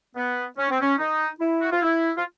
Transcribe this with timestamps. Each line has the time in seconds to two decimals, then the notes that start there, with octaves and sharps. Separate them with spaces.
0.15 B3
0.57 C#4
0.70 C4
0.81 C#4
0.99 D#4
1.40 E4
1.61 F#4
1.72 F4
1.81 E4
2.17 F4